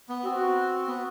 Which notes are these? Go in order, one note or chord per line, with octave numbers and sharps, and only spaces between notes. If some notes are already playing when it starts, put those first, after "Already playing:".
B3
C4 F#4
B3